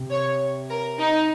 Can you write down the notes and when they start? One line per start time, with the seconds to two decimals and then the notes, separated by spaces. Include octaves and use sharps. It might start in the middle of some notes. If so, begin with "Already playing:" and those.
Already playing: C3
0.10 C#5
0.70 A#4
0.99 D#4